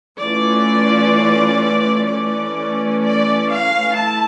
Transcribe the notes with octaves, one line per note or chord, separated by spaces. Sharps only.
E3 A3 C#4 F4 D5
E3 A3 C#4 D5
D5
F5
A3 E4 A5